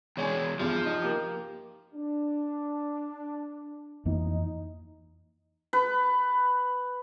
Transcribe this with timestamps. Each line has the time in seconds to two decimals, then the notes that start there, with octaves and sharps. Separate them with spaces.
0.17 E2 G#3 C#5 D5 G#5
0.60 E2 G2 F3
0.85 D#4
1.02 A#3 G4
1.94 D4
4.05 F2 E3 A#3 D#4
5.73 B4